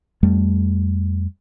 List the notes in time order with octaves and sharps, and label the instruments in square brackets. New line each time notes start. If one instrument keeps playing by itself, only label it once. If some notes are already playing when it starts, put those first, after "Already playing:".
[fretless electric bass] F2 G3 A3